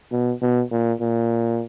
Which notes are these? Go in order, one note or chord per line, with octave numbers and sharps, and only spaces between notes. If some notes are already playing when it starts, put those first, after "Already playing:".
B2
B2
A#2
A#2